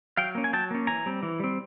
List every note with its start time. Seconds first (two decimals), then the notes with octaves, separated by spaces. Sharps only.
0.17 F#3 F5 G5
0.35 A#3 C#4
0.44 G#5
0.53 F#3 G5 A5
0.71 A#3 C#4
0.87 E3 G#5 A#5
1.06 G3 C4
1.23 E3
1.40 G3 C4